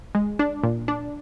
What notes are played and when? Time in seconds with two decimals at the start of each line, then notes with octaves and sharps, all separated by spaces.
0.15 G#3
0.39 D4
0.63 A#2
0.88 D4